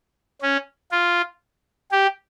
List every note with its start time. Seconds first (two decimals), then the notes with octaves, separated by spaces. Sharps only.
0.42 C#4
0.92 F4
1.92 G4